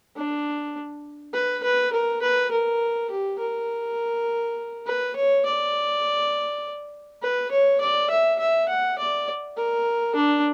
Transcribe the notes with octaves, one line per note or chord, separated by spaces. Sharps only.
D4
B4
B4
A#4
B4
A#4
G4
A#4
B4
C#5
D5
B4
C#5
D5
E5
E5
F#5
D5
A#4
D4